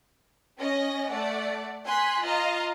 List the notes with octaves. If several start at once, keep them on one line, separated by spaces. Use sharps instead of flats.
C#4 D#5 A#6
A3 D5 F#5
G#5 C6 F#6 B6
F4 D#5 F5 A#5